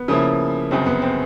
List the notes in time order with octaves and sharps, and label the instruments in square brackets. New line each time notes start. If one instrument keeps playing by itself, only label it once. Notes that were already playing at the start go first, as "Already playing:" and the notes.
Already playing: [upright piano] B3
[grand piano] C#3 F3 A#3 C#4 E4
[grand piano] G1 F#2 C#3 [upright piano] C4
[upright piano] B3
C4